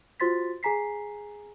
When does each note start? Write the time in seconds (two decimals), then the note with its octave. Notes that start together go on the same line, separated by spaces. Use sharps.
0.20 F4 F#4 C5 C6 A6 B6
0.63 G#4 G#5 A#5 B6 C7